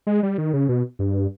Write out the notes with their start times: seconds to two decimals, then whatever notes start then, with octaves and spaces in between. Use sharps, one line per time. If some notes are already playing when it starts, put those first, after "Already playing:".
0.07 G#3
0.23 G3
0.38 D#3
0.53 C#3
0.69 B2
0.99 G2